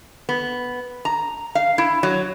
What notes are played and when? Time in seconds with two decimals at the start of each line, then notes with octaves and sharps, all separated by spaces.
0.29 B3
1.05 A#5
1.55 F5
1.78 E4
2.03 F#3